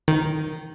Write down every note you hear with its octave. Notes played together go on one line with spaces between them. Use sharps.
D#3